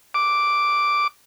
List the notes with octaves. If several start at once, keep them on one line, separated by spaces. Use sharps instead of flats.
D6